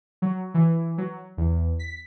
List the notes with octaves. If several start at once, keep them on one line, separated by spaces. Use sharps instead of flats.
F#3
E3
F#3
E2
B6